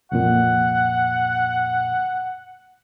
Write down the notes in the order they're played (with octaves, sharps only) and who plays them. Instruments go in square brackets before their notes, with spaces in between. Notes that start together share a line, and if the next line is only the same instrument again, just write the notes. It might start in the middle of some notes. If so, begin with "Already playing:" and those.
[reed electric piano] C2 F2 A#2 [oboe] F#5